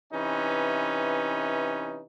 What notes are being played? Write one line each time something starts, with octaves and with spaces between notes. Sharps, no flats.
C3 E3 C#4 D#4 B4